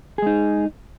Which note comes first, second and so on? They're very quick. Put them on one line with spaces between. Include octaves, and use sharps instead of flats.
G#4 G#3 D#4